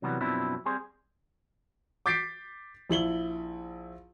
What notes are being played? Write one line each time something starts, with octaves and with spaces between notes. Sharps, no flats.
C3 E3 F#3 G3 B3
F#2 B2 F3 C4 D4 E4
G3 C4 G#4 C5
D6 G6 A6 B6 C7 D7
A#1 E4 F#7 G7